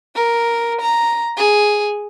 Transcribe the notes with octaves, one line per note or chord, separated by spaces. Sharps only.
A#4
A#5
G#4